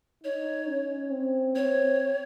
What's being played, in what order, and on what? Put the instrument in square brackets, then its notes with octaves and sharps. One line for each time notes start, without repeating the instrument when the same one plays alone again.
[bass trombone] D#4 [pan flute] C#5
[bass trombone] C#4
C4
[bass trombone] C4 [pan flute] C#5